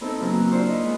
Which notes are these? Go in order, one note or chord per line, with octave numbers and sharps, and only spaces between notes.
B3 C4 D#4 E4 A4
C#3 F#3 A#3 C4 C#4
F#4
D4 E4 F4 C5 C#5
B4 D#5
G#3 B3